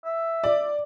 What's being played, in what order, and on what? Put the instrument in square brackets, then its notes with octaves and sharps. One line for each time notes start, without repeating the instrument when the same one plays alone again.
[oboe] E5
[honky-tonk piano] D5